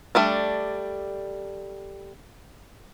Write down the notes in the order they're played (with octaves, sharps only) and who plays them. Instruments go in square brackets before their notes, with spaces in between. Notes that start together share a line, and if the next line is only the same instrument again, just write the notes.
[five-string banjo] G3 A3 D4